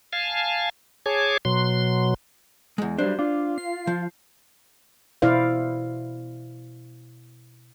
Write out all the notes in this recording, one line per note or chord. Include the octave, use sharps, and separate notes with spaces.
F5 G#5 A5
G#4 C#5 G#5 A5 D6
B2 F#3 C6
E2 G#3
F#3 G3 D4 C5
D4 F4
C7
F3
B2 E4 C5 D5 F5